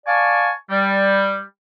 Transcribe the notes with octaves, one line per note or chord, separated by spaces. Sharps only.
D5 F5 G#5 A5 C#6
G3